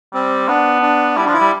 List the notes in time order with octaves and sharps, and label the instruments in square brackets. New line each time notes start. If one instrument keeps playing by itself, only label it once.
[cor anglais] G3 [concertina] C4
[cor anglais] B3 [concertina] D4
[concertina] D4
[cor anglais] G3 [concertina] E4
[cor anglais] F3 [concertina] D4
[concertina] E4
[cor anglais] G3